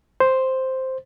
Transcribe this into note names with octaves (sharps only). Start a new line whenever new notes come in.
C5